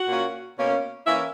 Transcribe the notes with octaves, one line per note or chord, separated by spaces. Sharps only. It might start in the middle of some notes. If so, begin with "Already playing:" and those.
Already playing: F#4 F#5
A#2 A#3 C#4
B2 A#3 C#4
E3 A#3 C#4 E4 E5